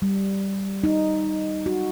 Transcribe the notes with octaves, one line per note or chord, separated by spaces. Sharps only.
G3
D#4
F#4